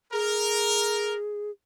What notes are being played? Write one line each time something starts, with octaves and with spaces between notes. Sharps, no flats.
G#4 A#4